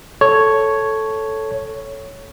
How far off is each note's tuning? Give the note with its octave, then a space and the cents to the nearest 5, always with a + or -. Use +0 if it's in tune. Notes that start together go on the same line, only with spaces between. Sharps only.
A4 +0 C#5 +0